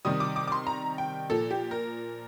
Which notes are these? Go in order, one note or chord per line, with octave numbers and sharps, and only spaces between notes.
C3 D#3 G3 D#6
D6
D6
D6
C6
A#5
G5
A#2 F3 A4
G4
A#4